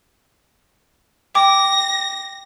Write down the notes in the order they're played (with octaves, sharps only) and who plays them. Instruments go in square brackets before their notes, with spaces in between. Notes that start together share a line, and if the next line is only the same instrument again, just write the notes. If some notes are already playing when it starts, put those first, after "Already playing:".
[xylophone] G5 D6 [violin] A#6